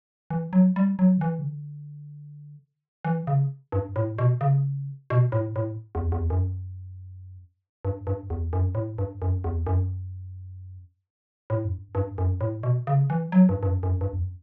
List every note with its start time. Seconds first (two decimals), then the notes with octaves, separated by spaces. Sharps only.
0.30 E3
0.53 F#3
0.76 G3
0.99 F#3
1.18 D3
1.21 E3
1.39 C#3
1.44 D3
3.05 E3
3.27 C#3
3.72 G2
3.96 A2
4.19 B2
4.41 C#3
5.10 B2
5.32 A2
5.56 A2
5.95 E2
6.12 E2
6.30 F#2
7.85 G2
8.07 G2
8.30 E2
8.53 F#2
8.75 A2
8.98 G2
9.22 F#2
9.44 E2
9.67 F#2
11.50 A2
11.65 F#2
11.73 G2
11.95 G2
12.18 F#2
12.41 A2
12.63 B2
12.87 C#3
13.10 E3
13.32 F#3
13.49 G2
13.63 G2
13.66 F#2
13.83 F#2
14.01 G2
14.13 E2
14.17 F#2